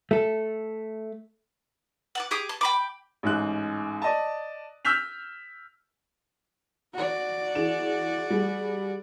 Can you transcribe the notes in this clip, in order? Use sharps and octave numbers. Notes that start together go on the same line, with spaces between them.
A3 A4
F#5 A5 D6
G4 G#4 D6 D#6
A5
G5 B5 D6
A1 G#2 F#6
D5 D#5 A5
E6 F6 G6 B6 F7
F#4 D5
E3 G#4 E7
G3 G#4